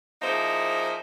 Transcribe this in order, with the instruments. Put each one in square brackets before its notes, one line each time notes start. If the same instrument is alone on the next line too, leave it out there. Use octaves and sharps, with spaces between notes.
[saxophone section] F3 A#3 D#4 E4 G#4 C5